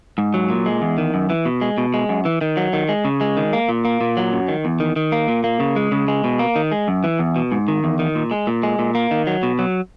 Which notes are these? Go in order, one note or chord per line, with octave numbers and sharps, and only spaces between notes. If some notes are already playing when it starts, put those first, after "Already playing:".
G#2
F#3
A#2
G#3
E2
D#3
F#2
E3
B2
G#3
B2
G#3
F#2
E3
D#3
F#3
D#3
G#3
C#3
G#3
D#3
A#3
A#2
A#3
A#2
F#3
F#2
D#3
E2
D#3
D#3
A#3
A#2
A#3
C#3
G#3
C#3
G#3
B2
A#3
D#3
G#3
F#2
E3
E2
B2
G#2
D#3
E2
D#3
A#2
G#3
A#2
G#3
A#2
A#3
D#3
F#3
B2
F#3